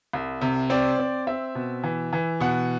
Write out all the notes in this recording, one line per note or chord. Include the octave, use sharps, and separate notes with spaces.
C2
C3
C4 D5
C4
C4 E5
B2
E3
E3
B2 F#5